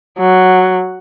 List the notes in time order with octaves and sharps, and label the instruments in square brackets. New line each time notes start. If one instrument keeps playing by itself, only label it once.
[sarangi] F#3